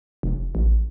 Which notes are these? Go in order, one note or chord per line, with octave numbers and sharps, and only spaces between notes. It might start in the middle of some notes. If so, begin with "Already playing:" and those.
F1
A1